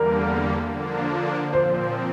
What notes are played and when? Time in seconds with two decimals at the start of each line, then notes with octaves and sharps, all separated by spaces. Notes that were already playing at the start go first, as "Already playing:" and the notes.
Already playing: E2 D3 G3 A#3 A#4
0.70 D3 F3 A#3 D4
1.53 A#2 F3 C4 C5